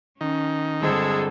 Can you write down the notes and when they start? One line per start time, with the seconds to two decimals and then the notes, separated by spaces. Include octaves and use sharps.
0.21 D#3 C#4
0.82 G1 G#3 C4 G#4 A4